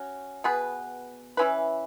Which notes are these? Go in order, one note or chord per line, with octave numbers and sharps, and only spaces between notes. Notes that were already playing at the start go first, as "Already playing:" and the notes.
Already playing: C#4 F#4
B2 B3 G#4 B4
E3 C#4 E4 B4